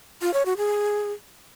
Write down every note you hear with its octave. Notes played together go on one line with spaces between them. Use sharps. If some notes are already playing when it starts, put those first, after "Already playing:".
F4
C#5
F#4
G#4